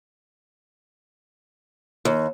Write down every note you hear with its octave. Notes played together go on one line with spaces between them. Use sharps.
D#2